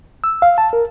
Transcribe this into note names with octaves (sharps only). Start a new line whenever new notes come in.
E6
F5
A5
A#4